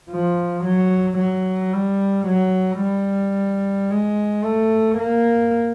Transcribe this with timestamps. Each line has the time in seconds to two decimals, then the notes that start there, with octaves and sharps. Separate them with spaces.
0.10 F3
0.65 F#3
1.18 F#3
1.73 G3
2.27 F#3
2.81 G3
3.90 G#3
4.44 A3
4.98 A#3